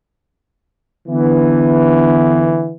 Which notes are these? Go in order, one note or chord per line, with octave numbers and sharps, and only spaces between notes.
D3 E3 B3